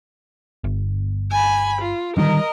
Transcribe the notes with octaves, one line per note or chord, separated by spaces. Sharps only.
G1
G#5 B5
F4
D3 D#3 G3 A#4 D#5